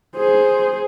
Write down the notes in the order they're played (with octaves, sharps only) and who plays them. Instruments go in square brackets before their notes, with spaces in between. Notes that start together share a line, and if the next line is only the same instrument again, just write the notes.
[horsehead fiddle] G#4 C5